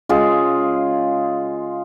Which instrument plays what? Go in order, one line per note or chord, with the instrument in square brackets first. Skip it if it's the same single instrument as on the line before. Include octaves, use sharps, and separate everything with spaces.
[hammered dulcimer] C#3 G#3 F4 G#4